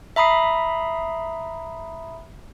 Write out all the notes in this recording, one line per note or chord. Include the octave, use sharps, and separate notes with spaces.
E5 A#5 B5 D#6 C7